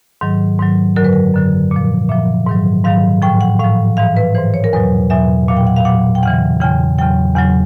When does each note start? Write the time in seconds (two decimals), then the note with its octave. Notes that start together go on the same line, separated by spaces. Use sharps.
0.21 G#2 D#3 F#3
0.59 G#2 D#3 F#3
0.96 F#2 D3 F#3 A#4
1.04 B4
1.13 A#4
1.34 F#2 D3 F#3
1.71 A#2 F3
2.09 A#2 F3 E5
2.47 G#2 D#3 F#3
2.85 G#2 D#3 F#3 F5
3.22 A2 F3 G5
3.41 F#5
3.59 A2 F3 F5
3.97 G#2 E3 F5
4.17 B4
4.34 G#2 E3 C5
4.54 C#5
4.64 A#4
4.73 E2 B2 F#3 B4
5.10 E2 B2 F#3 E5
5.48 A#2 F#3 F5
5.57 G5
5.67 F#5
5.76 F5
5.85 A#2 F#3 F#5
6.15 G5
6.23 E2 C#3 E3 F#5
6.61 E2 C#3 E3 G5
6.98 E2 C#3 F#3 G5
7.36 E2 C#3 F#3 F#5